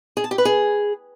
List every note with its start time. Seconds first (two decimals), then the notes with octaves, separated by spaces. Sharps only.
0.17 G#4
0.24 A5
0.31 G4
0.38 B4
0.45 G#4